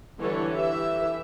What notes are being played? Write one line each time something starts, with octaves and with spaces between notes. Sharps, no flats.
D3 E3 G3 A4 C#5
E3 G4 E5